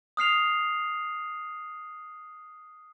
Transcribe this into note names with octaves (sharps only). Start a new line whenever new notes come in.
D#6 F6 C7 F7